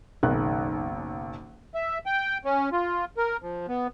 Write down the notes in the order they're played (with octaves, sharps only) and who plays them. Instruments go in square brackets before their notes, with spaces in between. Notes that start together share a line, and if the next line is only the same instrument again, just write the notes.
[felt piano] F#1 B1 D#3 F#6
[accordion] E5
G5
C#4
F4
A#4
F3
B3